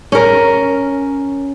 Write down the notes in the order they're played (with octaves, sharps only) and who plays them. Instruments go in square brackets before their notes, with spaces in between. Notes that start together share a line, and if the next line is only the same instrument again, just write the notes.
[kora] C#4 A#4